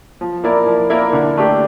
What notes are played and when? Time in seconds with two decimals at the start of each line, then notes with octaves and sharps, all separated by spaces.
0.21 F3
0.44 A#3 E4 A#4 D5
0.67 F3
0.90 A#3 E4 A#4 D5
1.13 D3
1.37 A3 D4 G4